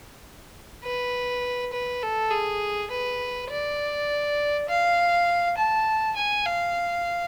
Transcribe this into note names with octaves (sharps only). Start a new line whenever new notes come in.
B4
B4
A4
G#4
B4
D5
F5
A5
G#5
F5